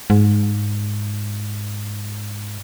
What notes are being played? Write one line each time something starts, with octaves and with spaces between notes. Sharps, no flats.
G#2